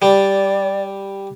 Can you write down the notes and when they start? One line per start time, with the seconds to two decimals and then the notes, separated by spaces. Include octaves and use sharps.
0.02 G3 D5